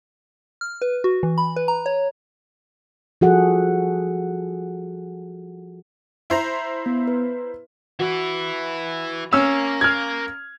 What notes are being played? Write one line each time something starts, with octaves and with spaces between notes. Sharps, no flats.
F6
B4
F#4
E3
B5
B4
A#5
C#5
F3 G3 F#4 G#4 A4 F#5
E4 C5 A#5
B3
B4
E3 E4 F#4
C#4 A#4 F5 E6
F6 G#6